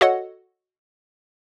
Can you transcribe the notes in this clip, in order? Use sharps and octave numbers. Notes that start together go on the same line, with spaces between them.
F#4 A4 C#5 D#5 F#5